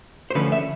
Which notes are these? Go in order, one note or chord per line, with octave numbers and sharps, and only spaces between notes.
C5
D3 F3 A3 C#4 B4
E5